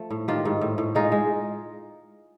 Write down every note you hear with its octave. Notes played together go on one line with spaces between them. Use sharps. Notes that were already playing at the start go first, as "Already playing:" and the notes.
Already playing: F3 A3
A2
D#3 F4 G4
G#2
A2
A2
G#3 D#4 F4
G#3